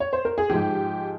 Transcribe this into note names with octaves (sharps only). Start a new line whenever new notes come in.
C#5
C5
A#4
G#4
G#2 F3 G4